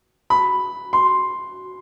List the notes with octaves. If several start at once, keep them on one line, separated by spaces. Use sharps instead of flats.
B5
C6